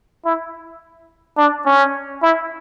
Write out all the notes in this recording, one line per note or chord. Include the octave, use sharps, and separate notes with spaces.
E4
D4
C#4
E4